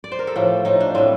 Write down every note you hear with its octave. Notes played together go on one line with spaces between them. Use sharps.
D5
C5
A#4
A4
A2 F3 G4
A2 F3 D#4
D4
A2 G3 C4